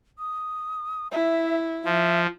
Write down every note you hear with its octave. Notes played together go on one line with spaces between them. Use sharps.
D#6
E4 E5
F3 E5